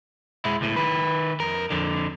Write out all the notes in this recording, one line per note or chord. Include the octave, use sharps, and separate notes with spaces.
G#3 E4
C#2 A2
D#3 B4
F2 A#4
F2 D3